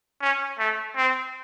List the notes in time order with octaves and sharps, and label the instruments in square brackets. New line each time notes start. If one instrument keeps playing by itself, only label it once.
[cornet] C#4
A3
C4